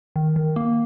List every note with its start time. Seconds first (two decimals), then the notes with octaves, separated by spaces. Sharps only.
0.16 D#3
0.36 D#3
0.56 A#3